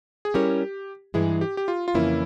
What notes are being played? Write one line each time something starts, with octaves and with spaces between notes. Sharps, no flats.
G#4
G3 C#4 E4 G4 A#4 C#5
G2 E3 G#3 E4 G#4
G4
G4
F4
F4
F2 C#3 E3 A#3 C#4 E4